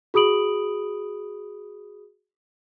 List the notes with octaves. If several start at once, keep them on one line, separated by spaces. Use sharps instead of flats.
F#4 G#4 B5 D#6 D7 F#7